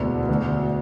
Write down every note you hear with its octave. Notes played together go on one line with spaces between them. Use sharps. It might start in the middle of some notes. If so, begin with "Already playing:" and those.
Already playing: E1 D2 D3
D2 D3